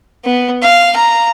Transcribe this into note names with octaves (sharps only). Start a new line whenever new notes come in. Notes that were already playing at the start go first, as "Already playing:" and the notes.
B3
F5
A#5